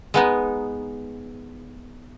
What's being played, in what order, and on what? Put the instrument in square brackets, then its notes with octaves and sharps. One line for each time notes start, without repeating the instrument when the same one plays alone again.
[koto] G#3 B3 D#4